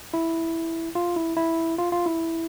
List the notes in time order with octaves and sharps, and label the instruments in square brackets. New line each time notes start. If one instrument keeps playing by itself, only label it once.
[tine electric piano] E4
F4
E4
E4
F4
F4
E4